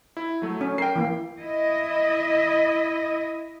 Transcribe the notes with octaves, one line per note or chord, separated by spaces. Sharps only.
E4
F#3 A3
C#4
A#4 G5 C7
E3 A#3
E4 D#5